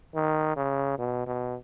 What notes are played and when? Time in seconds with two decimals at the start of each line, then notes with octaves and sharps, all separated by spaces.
0.15 D#3
0.56 C#3
0.98 B2
1.27 B2